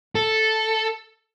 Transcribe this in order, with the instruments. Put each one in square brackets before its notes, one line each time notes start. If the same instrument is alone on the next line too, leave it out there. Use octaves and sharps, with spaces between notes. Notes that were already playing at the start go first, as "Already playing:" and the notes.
[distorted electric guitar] A4